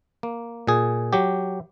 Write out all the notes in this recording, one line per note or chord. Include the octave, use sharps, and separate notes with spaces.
A#3
A#2 G#4
F#3 G4